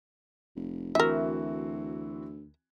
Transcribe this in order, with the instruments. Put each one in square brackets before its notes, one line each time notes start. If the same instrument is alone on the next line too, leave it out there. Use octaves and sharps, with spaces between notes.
[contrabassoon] F1
[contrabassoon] D2 [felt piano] E3 C4 F#4 [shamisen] A#4 E5